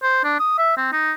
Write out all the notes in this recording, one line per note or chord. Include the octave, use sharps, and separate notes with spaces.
C5
D4
D#6
E5
C4
D#4